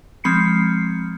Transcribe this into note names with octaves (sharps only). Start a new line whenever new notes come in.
F3 G#3 C4 B5 C7 C#7